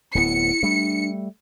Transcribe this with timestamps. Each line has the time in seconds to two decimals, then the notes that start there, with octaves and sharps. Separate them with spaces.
0.15 D1 B3 E4 C#7
0.63 G3 A3 D4